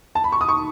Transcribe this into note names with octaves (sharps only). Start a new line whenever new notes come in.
A5
B5
C#6
D#6
C#6